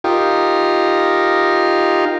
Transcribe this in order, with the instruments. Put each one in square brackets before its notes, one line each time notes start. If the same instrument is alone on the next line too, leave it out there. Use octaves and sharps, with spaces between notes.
[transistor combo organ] D#4 F4 G4 A#4